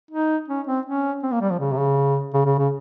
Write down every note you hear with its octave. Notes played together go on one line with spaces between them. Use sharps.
D#4
C#4
C4
C#4
C4
A#3
G3
F3
C#3
C3
C#3
C#3
C#3
C#3